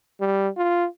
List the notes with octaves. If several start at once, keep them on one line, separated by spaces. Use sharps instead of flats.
G3
F4